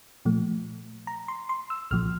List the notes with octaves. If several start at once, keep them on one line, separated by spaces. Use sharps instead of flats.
A#2 F3 A3
A#5
C6
C6
E6
C2 A#2 F3 F6